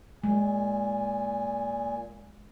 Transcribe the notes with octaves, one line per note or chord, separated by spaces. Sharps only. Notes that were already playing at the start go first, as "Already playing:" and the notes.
A#2 G#3 G#5